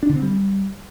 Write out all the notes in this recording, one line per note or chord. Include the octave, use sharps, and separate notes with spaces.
D4
D3
C4
G3